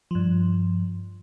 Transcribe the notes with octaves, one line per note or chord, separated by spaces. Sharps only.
G2 F3